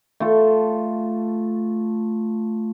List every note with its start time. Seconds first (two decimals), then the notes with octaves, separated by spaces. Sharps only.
0.20 A3 F4 A4